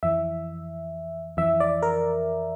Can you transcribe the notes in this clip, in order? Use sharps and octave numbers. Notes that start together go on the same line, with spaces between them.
F2 E3 E5
F2 E3 E5
D5
A#4